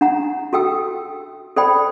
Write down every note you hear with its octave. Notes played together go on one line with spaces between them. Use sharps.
D4 F#5 A#5
F#4 A4 G5 E6
A4 C5 D5 G5 B5